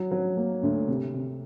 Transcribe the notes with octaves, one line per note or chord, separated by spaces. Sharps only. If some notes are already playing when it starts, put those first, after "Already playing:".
Already playing: F#3
F#3
A#3
D2
C3
C3